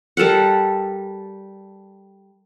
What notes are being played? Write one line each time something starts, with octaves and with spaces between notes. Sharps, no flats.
G3 A4 A#4 F#5